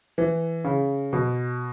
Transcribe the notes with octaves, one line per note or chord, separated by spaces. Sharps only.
E3
C#3
B2